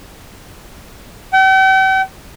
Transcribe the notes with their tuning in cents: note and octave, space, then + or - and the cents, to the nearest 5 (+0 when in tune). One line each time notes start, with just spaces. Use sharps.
G5 -45